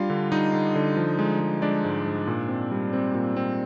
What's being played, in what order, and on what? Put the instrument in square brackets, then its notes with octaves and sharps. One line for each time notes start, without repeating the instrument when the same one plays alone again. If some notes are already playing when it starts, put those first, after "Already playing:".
Already playing: [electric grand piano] G3 D4 F4 F5
D3
G3 D#4 D#5
D3
D3
F3
G#3
G#3
G#3 D4 D5
G#2
G#2
A#2
C4
G3
C4
A#2
C4